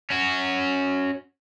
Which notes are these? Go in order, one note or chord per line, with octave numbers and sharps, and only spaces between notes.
C#4 F#4